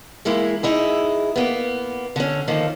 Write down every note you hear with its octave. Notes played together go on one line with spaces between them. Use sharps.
E3 G#3 A#3 E4
D#4 E4 G#4
A#3 B3
D3 C#4
D#3 F3 A#3 A4